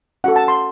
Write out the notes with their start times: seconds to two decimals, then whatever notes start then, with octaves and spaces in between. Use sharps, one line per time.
0.24 C#4 F#4 A4 F#5
0.36 A5
0.48 C6